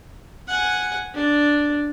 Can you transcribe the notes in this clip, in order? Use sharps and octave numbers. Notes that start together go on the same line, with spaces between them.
F#5 G#5
D4